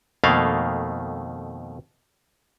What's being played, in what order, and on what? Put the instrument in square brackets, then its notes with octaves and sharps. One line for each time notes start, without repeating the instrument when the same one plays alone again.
[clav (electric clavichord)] F2 B2 D#3 A3 A#3 F5